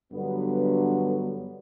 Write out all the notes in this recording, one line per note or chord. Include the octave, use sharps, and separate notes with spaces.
G2 D3 F#3 B3